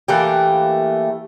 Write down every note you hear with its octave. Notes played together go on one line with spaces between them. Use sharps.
E3 A3 A#3 G4